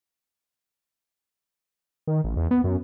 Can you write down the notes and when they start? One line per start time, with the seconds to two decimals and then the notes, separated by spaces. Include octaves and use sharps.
2.07 D#3
2.24 A1
2.37 E2
2.51 B3
2.64 F#2